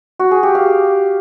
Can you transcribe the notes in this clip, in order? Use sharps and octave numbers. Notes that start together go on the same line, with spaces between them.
F#4
G#4
G4
F5